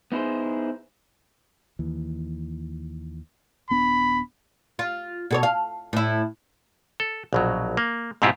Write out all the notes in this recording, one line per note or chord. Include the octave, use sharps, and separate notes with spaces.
B3 D#4 E4 G#4 C5
D#2 E3
D#1 B3 D4 B5
F4
B2 A4 C#5
F5
A2 E4
A4
A#1 B2 F#3
A#3
G#2 B2 C4 E4 F4 G4